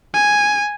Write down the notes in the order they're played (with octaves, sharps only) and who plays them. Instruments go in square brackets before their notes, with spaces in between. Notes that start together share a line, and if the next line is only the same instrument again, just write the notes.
[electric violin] G#5